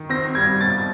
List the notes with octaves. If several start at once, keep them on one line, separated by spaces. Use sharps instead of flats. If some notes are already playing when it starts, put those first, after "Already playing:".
Already playing: D#3
C4 A#6
G3 G#6
B2 A6